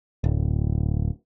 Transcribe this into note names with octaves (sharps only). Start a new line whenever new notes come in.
D1